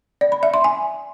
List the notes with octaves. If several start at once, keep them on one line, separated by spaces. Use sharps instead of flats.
D5
B5
E5
C6
G#5